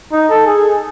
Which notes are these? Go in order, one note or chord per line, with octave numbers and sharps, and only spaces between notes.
D#4
A4
G#4